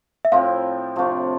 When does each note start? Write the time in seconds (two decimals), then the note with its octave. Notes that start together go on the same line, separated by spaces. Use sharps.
0.25 E5
0.32 A2 F3 C4 E4 F5
0.96 C3 F3 A3 D4